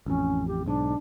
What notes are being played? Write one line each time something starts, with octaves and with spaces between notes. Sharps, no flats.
A1 F2 C#4
G4
B1 G#2 D4